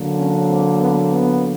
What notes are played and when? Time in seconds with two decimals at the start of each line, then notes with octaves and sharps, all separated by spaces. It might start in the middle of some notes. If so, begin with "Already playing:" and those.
Already playing: D3 F#3 A#3
0.19 C#4
0.48 C4
0.79 B3
1.09 B3